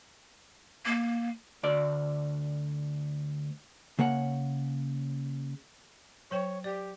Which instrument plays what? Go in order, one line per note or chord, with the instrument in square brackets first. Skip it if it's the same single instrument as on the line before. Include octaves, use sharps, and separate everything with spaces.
[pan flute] A#3
[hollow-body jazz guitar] D2 D5
C#3 A#3 C#5 F#5
[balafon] F#3 C5 G5 [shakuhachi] C#5
[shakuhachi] G4 [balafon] D5